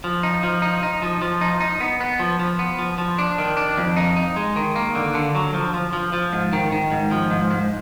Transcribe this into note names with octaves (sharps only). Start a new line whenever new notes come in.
F3
D#4
F3
D#4
D#4
F3
F3
D#4
D#4
B3
B3
F3
F3
B3
F3
F3
D4
D#3
D4
F2
D#4
D#4
G#3
D#3
A#3
D3
D3
F#3
F3
F3
F3
F3
G#2
D#3
D#3
G#2
F3
G#2
G#2